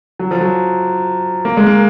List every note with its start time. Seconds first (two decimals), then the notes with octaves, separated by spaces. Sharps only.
0.19 F#3
0.31 F3
0.41 F#3
1.45 A#3
1.57 G#3
1.67 A#3